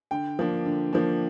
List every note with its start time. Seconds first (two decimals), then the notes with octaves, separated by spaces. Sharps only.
0.11 D3 G5
0.39 F3 A#3 D4
0.66 D3
0.93 F3 A#3 D4